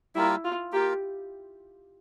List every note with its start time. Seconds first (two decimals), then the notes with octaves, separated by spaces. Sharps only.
0.15 G3 A#3 E4 F4 A#4
0.44 F4
0.73 A#3 F4 G4 A#4